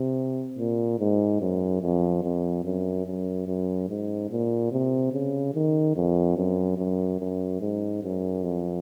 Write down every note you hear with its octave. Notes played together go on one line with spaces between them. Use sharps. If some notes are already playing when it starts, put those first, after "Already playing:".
Already playing: C3
A#2
G#2
F#2
F2
F2
F#2
F#2
F#2
G#2
A#2
C3
C#3
D#3
F2
F#2
F#2
F#2
G#2
F#2
F2